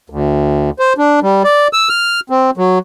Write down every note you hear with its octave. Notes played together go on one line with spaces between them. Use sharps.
D2
C5
D4
G3
D5
E6
F6
C4
F#3